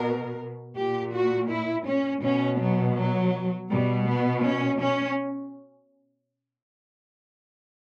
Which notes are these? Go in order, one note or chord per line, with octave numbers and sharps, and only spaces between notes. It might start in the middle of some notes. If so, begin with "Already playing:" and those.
Already playing: B2 A#4
A#2 G4
F#4
E4
C#4
B2 C#4
F#3
F#3
B2 G3
B3
C#4
C#4